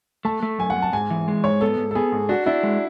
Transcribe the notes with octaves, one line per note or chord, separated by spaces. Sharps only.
A3 A5
A3
F#2 G#5
F#5
F#2
A5
G#2 G#5
E3
G#3
G#2 C#5
B3 A4
G#2
A4
B3 G#4
G#2
D4 F#4
D4 E4
G#3